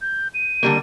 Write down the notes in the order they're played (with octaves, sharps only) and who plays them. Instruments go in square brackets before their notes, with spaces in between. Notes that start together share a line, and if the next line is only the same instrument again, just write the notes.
[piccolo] G6
D#7
[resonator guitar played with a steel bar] D3 G3 A#3